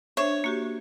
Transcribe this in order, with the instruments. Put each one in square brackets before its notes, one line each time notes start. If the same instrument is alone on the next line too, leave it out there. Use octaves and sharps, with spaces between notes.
[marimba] D4 C5 E5 [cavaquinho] C#5
[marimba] A#3 F#4 G4